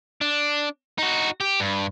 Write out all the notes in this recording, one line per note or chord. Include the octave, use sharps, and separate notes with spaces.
D4
D#4 F#4
G4
G2